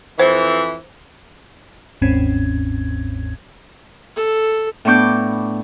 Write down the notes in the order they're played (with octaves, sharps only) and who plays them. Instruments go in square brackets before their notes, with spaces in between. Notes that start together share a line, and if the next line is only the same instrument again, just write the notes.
[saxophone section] F2 E3 [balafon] C5
[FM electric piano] G1 D#2 G#2 C4 C#4 G#6
[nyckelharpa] A4
[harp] A2 B3 D4 C#6 D6 G6